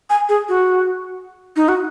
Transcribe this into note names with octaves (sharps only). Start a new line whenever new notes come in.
G#5
G#4
F#4
D#4
F#4